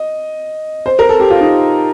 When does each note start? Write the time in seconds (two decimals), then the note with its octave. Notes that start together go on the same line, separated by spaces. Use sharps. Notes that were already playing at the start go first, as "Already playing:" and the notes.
Already playing: D#5
0.86 C5
0.99 A#4
1.09 A4
1.20 G4
1.30 F4
1.41 D#4